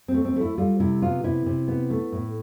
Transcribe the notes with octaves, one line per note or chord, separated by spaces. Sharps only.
C4
A3
C4
A3 E4
G3 F4
C3 E4
B3 F4
C3 E4
C3
B3
A3
A2